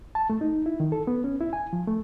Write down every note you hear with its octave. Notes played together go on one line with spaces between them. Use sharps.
A5
A3
D#4
E4
D#3
A4
B3
C#4
E4
G#5
F3
A3